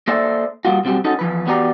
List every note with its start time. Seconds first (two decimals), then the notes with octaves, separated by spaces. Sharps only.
0.08 A#3 A4 C5 D5 E5
0.65 G3 A#3 F4 F#4
0.84 B1 G3 C4 F#4 G4
1.04 C#4 D#4 F#4 A4
1.19 E2 F3 B4
1.46 E2 B3 F#4 G4 D5 A#5